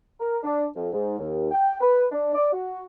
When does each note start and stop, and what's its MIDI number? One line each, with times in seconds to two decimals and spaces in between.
0.20 0.37 70
0.43 0.64 62
0.75 0.89 41
0.93 1.19 44
1.19 1.47 39
1.51 1.76 79
1.81 2.05 71
2.12 2.32 62
2.34 2.47 74
2.52 2.83 66